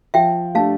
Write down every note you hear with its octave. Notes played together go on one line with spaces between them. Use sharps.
F3 E5 G5
A3 D4 G4 F5 A5